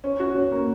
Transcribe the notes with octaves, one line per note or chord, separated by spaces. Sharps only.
C#4
F#4
C#4
A#3